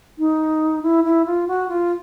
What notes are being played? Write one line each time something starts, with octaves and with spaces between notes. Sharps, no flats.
D#4
E4
E4
F4
F#4
F4